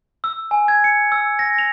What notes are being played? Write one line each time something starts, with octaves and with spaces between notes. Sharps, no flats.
E6
G#5
G#6
C#7
E6
A#6
F7